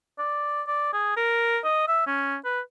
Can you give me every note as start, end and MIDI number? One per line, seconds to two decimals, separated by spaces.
0.19 0.62 74
0.67 0.93 74
0.93 1.15 68
1.17 1.58 70
1.64 1.87 75
1.88 2.02 76
2.07 2.37 61
2.45 2.60 71